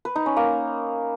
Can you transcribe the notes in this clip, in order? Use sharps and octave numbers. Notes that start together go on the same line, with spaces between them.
B4
D#4
C#4
A#3